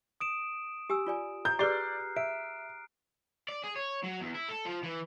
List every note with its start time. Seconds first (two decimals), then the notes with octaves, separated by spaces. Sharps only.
0.21 D#6 D7 E7
0.90 G4 G#5 E6
1.07 F4 D5 G#5
1.45 A#5 G6
1.59 G4 G#4 B4 D5 F6 F#6 C7 G7
2.16 E5 D7
3.49 D5
3.64 G#4
3.76 C#5
4.04 F#3
4.21 E2
4.35 E4
4.49 A4
4.66 F3
4.83 E3